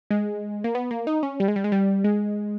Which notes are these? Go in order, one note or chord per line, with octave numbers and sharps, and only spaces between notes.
G#3
A#3
B3
A#3
D#4
C#4
G3
G#3
G3
G#3
G3
G#3